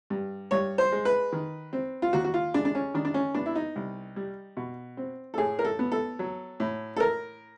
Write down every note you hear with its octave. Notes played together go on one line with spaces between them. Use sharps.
G2
G2 C#5
C5
G#3
B4
D#3
C4
F4
D#2 F#4
F#4
F4
G#3 D4
D4
C#4
D#3 D4
D4
C#4
B3 D4
E4
D#4
C2
G3
B2
C4
A4
A2 G#4
A#4
A4
B3
A4
F#3
A2
A4
A#4